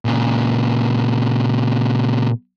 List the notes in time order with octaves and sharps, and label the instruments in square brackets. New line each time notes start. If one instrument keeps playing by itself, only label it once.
[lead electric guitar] A#2 C#3